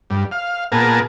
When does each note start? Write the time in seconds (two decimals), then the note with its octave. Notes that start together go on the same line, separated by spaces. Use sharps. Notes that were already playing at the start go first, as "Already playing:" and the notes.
0.10 G2
0.31 F5
0.72 A#2 B3 G#4 A#4 A5